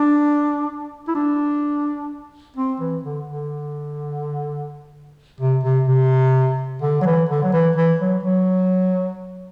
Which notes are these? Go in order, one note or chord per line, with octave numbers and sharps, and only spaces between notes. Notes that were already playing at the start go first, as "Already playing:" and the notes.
Already playing: D4
E4
D4
C4
E3
D3
D3
C3
C3
C3
D3
F#3
E3
D3
F#3
E3
E3
F#3
F#3